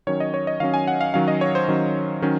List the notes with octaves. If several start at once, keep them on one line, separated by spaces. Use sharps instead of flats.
D#3 F#3 C#4 C#5
D#5
C#5
D#5
D#3 F#3 C#4 F5
G#5
F#5
F5
D#3 F#3 C#4 F5
D#5
C#5
C5
D#3 F#3 C#4
D#3 F#3 C#4